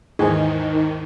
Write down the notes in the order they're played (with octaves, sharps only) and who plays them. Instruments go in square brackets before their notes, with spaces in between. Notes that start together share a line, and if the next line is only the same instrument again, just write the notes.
[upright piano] D#2 G#2 E3 [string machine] D#3 [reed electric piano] D#4 C5 [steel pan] G#4